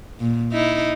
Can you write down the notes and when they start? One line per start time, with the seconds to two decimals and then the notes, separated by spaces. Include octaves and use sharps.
0.20 A#2
0.52 D#4 E4